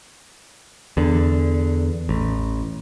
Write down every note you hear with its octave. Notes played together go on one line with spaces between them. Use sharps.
E2 D3
A1